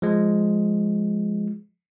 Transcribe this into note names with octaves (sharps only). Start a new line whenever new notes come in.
F3 G#3